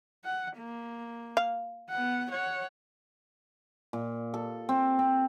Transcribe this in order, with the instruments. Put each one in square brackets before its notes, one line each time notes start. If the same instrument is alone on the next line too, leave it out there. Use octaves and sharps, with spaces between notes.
[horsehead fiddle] F#5
A#3
[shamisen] F5
[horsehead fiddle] B3 F#5
C#5 F#5
[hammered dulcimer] A#2
A4
C4
C4